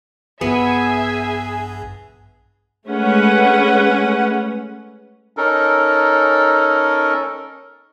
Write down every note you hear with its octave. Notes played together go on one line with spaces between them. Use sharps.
A#1 G2 B3 G#4 E5 G#5
G#3 A3 C#4 B4 F#5
C#4 D#4 A4 A#4